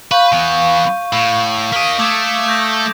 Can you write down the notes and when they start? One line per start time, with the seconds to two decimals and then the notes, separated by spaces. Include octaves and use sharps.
0.11 B4 F5 C#6 G6
0.33 E3 B3
1.13 A2
1.72 A#3 D#5 B6 D7
1.99 A3 D6 D#6 G#6
2.48 G6 A#6